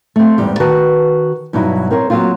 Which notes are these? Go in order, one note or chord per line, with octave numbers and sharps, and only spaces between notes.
A3 C4
E2 G#2 G3
D#3 F#4 B4 A5
G2 B2 F#3 D#4 E4
C4 A#4 C#5
F#3 G3 A#3 C4 F4